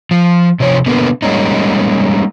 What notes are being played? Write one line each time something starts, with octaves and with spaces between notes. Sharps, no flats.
F3
C3 F3 C#5
B2 D3 A#3 B3
G3 G#3 A#3 C#4 D#4